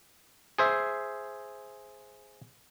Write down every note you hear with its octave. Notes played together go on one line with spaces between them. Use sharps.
G#4 C5 E5